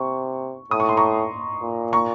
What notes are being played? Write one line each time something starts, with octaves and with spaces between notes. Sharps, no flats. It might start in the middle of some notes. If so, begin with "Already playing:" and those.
Already playing: C3 C#6
A2 D#6
C#6
C6
A#5 C#6
A#2
A#5 C#6